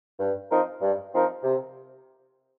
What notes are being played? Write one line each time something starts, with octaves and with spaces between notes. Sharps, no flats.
G2
F3 C4 D#4 A#4
G2
F3 C4 D#4 A#4
C3